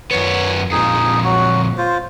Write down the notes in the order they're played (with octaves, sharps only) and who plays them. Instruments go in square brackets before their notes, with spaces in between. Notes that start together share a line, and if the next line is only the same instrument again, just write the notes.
[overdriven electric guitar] F#2 B3 [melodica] C#5
[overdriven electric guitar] F2 A#2 [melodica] D#4 G#4
[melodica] F#3 F#4
F4 C5